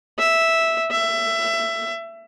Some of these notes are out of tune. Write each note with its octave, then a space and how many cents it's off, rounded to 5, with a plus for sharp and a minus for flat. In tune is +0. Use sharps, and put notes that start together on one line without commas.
E5 -5
E5 +20